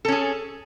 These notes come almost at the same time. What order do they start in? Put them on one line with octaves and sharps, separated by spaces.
A4 C#4 G#4